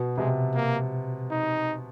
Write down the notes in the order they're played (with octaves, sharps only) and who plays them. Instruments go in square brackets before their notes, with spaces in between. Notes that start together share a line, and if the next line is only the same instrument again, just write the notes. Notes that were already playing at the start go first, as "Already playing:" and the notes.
Already playing: [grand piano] B2
[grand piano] C3 [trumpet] G#3
[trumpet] A#3
D#4